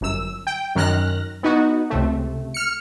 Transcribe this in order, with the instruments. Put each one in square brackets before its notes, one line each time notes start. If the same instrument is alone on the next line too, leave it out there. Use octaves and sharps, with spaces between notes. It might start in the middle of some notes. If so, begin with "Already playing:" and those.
[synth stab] G1 F#2 E6
G5
F#2 D#3 F6 F#6 A#6
B3 D#4 F#4
C#2 C3 A3
F6 C#7